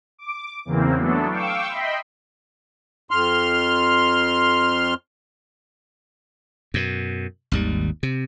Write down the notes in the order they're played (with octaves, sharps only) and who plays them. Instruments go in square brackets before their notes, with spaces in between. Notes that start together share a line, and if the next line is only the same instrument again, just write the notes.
[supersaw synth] D6
E2 C#3 E3 A#3 C4
E3 F#3 A3 B3 D4 A4
F5 G5 C#6 D6 E6
D#5 E5 G5 B5 C6
[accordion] F2 C6 F6
[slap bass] F#2 B2
G#1 D#2 G3
C3